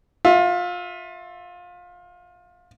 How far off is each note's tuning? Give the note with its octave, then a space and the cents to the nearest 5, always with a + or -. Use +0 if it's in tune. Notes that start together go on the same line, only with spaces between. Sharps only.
F4 +25 E5 +0